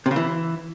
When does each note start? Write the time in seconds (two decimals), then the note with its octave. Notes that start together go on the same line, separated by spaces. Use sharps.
0.06 C3
0.11 C#3
0.16 E3